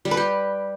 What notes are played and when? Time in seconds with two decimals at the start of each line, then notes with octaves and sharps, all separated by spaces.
0.05 G3
0.11 B4
0.17 G4